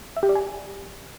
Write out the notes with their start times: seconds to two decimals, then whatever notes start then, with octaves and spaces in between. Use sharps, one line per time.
0.17 E5
0.23 G4
0.29 D5
0.35 G#5